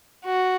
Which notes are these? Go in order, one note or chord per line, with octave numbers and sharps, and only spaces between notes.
F#4